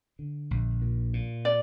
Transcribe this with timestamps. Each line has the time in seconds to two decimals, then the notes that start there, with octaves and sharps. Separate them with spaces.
0.19 D3
0.51 A#1
0.82 A#2
1.13 A#2
1.45 D5